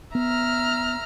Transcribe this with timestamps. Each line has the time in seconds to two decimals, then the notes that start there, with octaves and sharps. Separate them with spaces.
0.15 B3 E5 A#5 F6